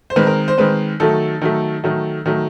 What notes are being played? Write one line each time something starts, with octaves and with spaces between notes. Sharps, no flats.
C5
D#3 G#3 C4 B4
A#4
C5
D#3 G#3 C4 B4
D#3 F#3 A3 A4
D#3 F#3 A3
D#3 F#3 A3
D#3 F#3 A3